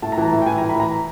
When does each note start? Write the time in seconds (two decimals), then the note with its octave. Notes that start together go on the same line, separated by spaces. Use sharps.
0.02 A2 A5
0.12 A#5
0.17 E3 A5
0.32 A2
0.42 G5
0.46 E3 G#5
0.58 A#5
0.61 A2
0.69 B5
0.76 E3 A#5